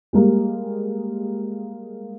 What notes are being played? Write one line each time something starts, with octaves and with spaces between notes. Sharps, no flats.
G3 G#3 A#3